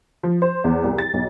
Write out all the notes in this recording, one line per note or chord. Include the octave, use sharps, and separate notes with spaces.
F3
C5
E2
C2
A6
B1